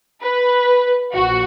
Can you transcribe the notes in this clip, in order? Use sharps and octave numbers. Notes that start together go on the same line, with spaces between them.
B4
A#1 F#4